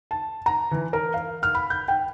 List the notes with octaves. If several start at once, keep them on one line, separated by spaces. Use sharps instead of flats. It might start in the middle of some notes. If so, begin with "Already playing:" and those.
A5
A#5
E3
A#4
F5
F6
B5
G6
G5